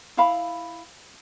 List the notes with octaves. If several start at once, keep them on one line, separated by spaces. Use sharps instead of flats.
E4 F5 B5